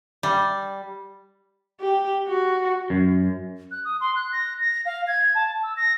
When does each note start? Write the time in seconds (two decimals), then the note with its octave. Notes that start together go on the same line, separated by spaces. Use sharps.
0.23 G3
1.81 G4
2.28 F#4
2.90 F#2
3.71 F#6
3.85 D#6
4.01 C6
4.16 F#6
4.33 A#6
4.61 A#6
4.86 F5
5.07 G#6
5.35 A5
5.63 E6
5.77 A#6